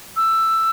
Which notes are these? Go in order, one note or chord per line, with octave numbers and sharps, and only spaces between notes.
E6